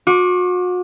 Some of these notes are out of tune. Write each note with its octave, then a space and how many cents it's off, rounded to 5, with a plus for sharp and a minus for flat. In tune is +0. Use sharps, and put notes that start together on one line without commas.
F#4 -40 D6 +0